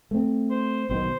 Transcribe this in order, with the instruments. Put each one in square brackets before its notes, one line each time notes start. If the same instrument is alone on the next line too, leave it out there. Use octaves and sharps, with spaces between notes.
[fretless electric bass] A3 C4
[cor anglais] C5
[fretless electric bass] B1 B2 D#3 [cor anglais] C5